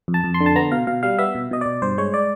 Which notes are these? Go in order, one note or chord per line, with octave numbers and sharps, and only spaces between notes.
F2
A5
F2
C6
D3
A5
B3 A#5
B2 F5
B2 F5
G3 F5
B3 E5
B2
B2 D#5
B2 D5
G2 C5
G#3 C#5
D5